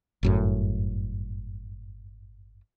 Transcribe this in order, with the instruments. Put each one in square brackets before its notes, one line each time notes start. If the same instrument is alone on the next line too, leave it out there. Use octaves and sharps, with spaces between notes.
[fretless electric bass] G1 F#2 A2